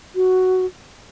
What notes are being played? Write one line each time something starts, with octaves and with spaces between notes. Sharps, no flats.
F#4